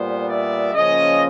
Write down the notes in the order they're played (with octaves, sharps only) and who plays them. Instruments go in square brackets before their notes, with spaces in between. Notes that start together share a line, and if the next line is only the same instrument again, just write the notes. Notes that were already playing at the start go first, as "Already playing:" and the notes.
Already playing: [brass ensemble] A#2 G3 B3 C5
D5 E5
C#3 F3 A#3 C#4 C#5 D#5